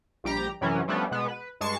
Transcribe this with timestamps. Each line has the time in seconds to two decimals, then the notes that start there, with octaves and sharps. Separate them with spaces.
0.24 A#1 G3 G4 A#5
0.61 F#2 C3 E3 F#3 C#4
0.88 F3 G3 A3 B3 C#4 D4
1.11 B2 G#3 B3
1.29 B4
1.61 G2 G#3 A5 C#6 C7